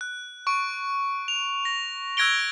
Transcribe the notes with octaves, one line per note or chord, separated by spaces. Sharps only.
F#6
C#6 D7
F7
A#6
E6 F#6 G#6 A#6 D7 G7